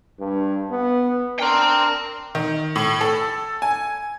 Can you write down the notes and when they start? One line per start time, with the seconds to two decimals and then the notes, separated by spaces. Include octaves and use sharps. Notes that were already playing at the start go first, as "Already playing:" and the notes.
0.20 G2
0.71 B3
1.39 D4 A#4 G5 C6
2.35 D#3
2.76 A2
3.01 A4
3.62 G#5